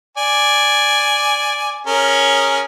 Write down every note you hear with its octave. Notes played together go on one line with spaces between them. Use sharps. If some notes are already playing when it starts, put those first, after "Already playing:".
D5 G#5
C#4 G#4 A#4